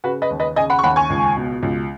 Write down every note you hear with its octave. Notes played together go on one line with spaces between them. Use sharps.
C#3 F#4 B4
B4 D#5
D#2
B4 D#5
C#3 D#5 G#5
F#5 B5
C#6
D#2 F#5 B5
G#5 C#6
C#2
B2
C#2